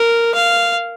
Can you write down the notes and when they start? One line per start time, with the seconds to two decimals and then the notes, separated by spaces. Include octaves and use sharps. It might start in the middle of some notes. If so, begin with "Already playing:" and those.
Already playing: A#4
0.35 F5